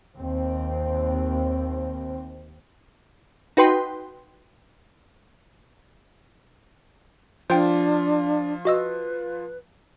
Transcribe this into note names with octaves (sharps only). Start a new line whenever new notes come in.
D#2 C4
D#4 F#4 B4 G5 C6
F3 D4 F4 C5 G5
F#4 B4 D#5 E6